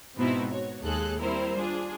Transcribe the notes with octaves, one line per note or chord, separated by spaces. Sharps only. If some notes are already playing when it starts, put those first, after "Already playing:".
G#2 B2 B3 C4 D#4 E4
F#4 C#5
D#2 G#3 G#4 A4 F#6
G3 C4 E4 A#4 C5
D4 F4 G#4